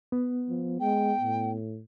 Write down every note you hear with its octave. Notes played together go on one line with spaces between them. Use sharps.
B3
F3
G#3 G5
A2